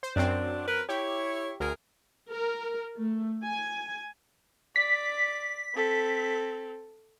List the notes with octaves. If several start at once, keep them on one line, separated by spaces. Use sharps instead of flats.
C5
F#2 F#3 C4 D4
A#4 B4
E4 G4 C#5
D2 G#4 A#4
A#4
A3
G#5
D5 B6
C4 A4